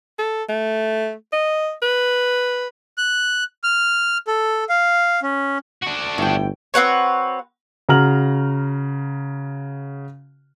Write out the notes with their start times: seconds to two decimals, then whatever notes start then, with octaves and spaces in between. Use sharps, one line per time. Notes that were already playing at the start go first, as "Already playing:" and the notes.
0.19 A4
0.49 A3
1.33 D#5
1.82 B4
2.98 F#6
3.63 F6
4.27 A4
4.69 F5
5.22 C#4
5.83 D4 F#4
6.18 G1 A2 G5
6.74 C4 F#4 B4 C#5
7.89 C#3 F#4 A#5 F6 F#7